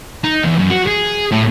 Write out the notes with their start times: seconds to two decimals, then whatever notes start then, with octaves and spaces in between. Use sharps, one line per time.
0.24 D#4
0.44 E2
0.59 F#2
0.70 F#4
0.87 G#4
1.32 A2